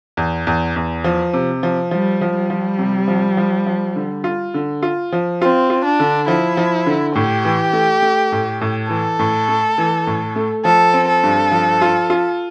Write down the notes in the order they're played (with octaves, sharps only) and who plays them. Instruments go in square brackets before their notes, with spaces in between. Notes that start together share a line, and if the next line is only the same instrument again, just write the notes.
[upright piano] E2
E2
E2
F3
C3
F3
[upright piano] F3 [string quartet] G3
[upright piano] F3
[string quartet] G3
[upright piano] F3
C3
F3
F3
F3
D3
F4
D3
F4
F3
[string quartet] C4 [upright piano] F4
[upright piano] F4
[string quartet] D4
[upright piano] D3
[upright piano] F3 [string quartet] E4
[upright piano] F3
D3
[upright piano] A2 [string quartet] G4
[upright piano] E3
A3
A3
A2
A2
[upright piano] E3 [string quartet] A4
[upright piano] A2
A3
E3
A2
A3
[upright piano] F3 [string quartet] A4
[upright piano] C4
[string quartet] A4
[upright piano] G2
F3
F4
F4